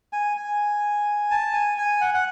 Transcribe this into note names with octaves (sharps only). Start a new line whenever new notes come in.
G#5
G#5
A5
G#5
G#5
F#5
F#5